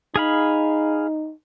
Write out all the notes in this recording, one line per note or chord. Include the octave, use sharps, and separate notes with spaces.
D#4 G#4 F5 B5